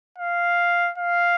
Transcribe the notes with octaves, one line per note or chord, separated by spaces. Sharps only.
F5
F5